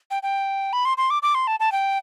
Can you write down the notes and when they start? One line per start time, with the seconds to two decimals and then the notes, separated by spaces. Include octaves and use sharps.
0.11 G5
0.23 G5
0.73 B5
0.85 C6
0.97 C6
1.10 D6
1.22 D6
1.35 C6
1.47 A5
1.60 A5
1.72 G5